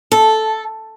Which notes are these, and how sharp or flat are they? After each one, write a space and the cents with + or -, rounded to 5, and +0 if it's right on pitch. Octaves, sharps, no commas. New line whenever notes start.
A4 -5